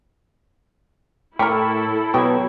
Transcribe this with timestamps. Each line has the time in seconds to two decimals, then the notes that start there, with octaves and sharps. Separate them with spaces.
1.39 A2 E4 G4 A4 A#4 B5 C#6
2.14 B2 F#3 G4 G#6